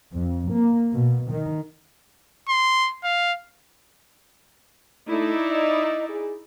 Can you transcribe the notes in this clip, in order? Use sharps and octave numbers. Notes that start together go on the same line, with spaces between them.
F2
A#3
B2
D#3
C6
F5
A3 D#4 E4 D5
D#5
G#4